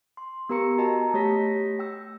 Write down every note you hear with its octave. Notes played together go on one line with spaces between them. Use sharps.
C6
B3 G4 A#4 A#5 E6 C#7
F#4 D#5 A5 A#5
A3 G4 C#5 A#6 B6
G5 E6